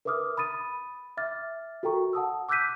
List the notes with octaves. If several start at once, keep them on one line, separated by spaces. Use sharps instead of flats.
A#4 B4 E5 D6 D#6 F6
B5 D#6 A6 D#7
E5 D6 F6 A6
F#4 A4 A#4 G5 A#5 C#6
F#5 A5 D#6 E6
D6 E6 F#6 G6 B6 D#7